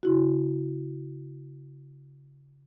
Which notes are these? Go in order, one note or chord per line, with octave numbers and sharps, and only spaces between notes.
C#3 E4 F#4